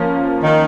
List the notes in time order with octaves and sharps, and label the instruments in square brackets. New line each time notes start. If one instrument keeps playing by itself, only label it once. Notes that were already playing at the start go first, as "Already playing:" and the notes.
Already playing: [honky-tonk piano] F3 A#3 C#4 F4 A#4
[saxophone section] D#3